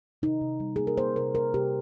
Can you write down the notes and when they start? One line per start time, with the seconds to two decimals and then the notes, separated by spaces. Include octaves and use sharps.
0.22 C3 D#4
0.41 C3
0.60 G3
0.76 A#3 G#4
0.87 A#4
0.97 A#3 C5
1.16 C3 A#4
1.35 A#3 A#4
1.54 C3 G4